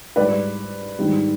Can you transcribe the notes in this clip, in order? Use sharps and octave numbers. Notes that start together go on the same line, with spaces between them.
G#2 G3 B4 D5
G#2 D#3 G3